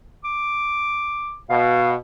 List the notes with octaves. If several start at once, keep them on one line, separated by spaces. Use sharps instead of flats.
D6
B2 F5